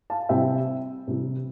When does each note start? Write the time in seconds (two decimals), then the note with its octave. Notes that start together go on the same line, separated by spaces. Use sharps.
0.10 F5 A5
0.29 C3 G3 C4 E4 E5 G5
1.07 C3 E3 G3